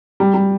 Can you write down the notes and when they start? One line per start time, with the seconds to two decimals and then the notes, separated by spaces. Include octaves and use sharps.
0.20 G3
0.34 G3